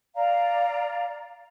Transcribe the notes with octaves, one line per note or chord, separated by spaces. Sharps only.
D5 F5 A#5